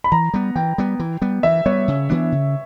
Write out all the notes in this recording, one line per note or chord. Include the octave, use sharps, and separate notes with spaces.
B5
E3 A#5
G3 B3
E3 G5
G3 B3
E3
G3 B3
E3 E5
G3 B3 C#5
C#3
E3 B3 D4
C#3